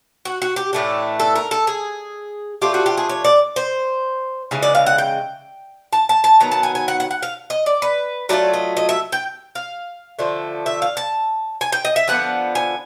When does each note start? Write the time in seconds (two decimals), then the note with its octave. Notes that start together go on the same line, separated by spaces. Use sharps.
0.25 F#4
0.42 F#4
0.56 G4
0.73 A2 E3 A3 D4
1.20 A4
1.36 A#4
1.51 A4
1.67 G#4
2.62 F3 A3 D4 F4 G4
2.74 F#4
2.86 G4
2.98 G#4
3.09 C#5
3.24 D5
3.56 C5
4.51 C#3 E3 G#3
4.63 D5
4.75 F5
4.86 F#5
4.98 G5
5.93 A5
6.09 A5
6.24 A5
6.40 D#3 F#3 B3 A#5
6.52 A5
6.63 G#5
6.75 G#5
6.88 F#5
7.00 F#5
7.11 F#5
7.23 F5
7.50 D#5
7.66 D5
7.82 B4
8.29 F#3 A3 D4 F4 D5
8.54 D#5
8.77 D#5
8.89 E5
9.12 G5
9.55 F5
10.19 D3 F3 A3
10.66 E5
10.82 F5
10.97 A5
11.61 G#5
11.72 G5
11.85 D#5
11.96 E5
12.07 D3 F3 B3 F#5
12.55 G#5